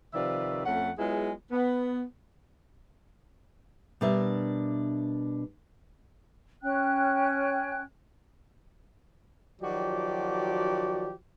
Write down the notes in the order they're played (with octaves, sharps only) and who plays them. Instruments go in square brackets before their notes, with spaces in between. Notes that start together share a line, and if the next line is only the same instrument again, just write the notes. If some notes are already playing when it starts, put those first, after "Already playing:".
[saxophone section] C3 D#3 F3 B4 D5 E5
F2 A3 C#4 F#5
F#3 G#3 B3 E4 F4 G#4
B3
[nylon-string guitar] B2 G3 D4 A#4 E5
[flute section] C#4 G5 F#6
[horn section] D#3 F3 F#3 F#4 G4 D5